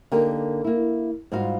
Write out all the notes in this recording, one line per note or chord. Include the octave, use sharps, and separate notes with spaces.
D3 A#3 D#4 G4 A#4
A#3 E4
G#2 G3 F4 F#4 F5